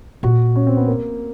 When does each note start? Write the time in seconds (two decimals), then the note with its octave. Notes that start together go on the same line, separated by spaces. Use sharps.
0.23 A#2 F#4
0.56 C#4
0.67 C4
0.77 B3
0.87 A#3